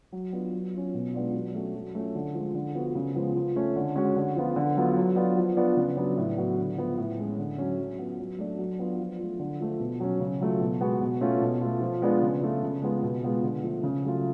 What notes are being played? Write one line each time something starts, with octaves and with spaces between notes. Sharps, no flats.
F#3
B3 D4 F4
F#3
C#4 F4
B2
G#3 B3 D4 F4
F#3
A3 C#4 F#4
F#3
A3 C#4 F4
D3
F3 G#3
D3
F3 B3 F#4
C#3
F3 G#3 B3
F3
A3 C#4
D3
G#3 C#4 F#4
D3
F3 B3 F4
D3
F#3 B3 F4
F#3
B3 D4 F4
F3
B3 D4 F4
C#3
F#3 B3 D4
A2
F#3 B3 F#4
D3
F3 B3
A2
G#3 C#4
D3
F#3 C#4
F#3
B3 F4
F#3
A3 D4 F#4
F#3
B3 D4 F4
F3
A3 F4
D3
F3 A3
B2
F#3 C#4
C#3
F#3 A3 F4
B2
G#3 B3 F#4
B2
A3 C#4 F4
B2
A3 F4
F3
G#3 B3 D4 F4
C#3
F3 A3 F4
C#3
G#3 B3 F4
B2
G#3 B3 F4
D3
F3 A3
C#3
F#3 A3 F4